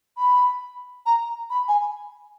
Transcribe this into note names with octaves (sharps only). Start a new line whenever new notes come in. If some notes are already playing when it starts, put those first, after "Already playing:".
B5
A#5
B5
G#5